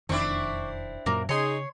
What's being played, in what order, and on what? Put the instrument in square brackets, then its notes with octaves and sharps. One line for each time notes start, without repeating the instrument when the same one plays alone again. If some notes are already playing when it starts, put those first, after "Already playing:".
[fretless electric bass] E1 F2 D#3 [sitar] C4 D4 E4 [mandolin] C#6 D6
[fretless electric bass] F#2 A#2 F#3 [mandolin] A#3 A#4
[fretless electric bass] C#3 [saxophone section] D#4 G#4 [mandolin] C#5 C6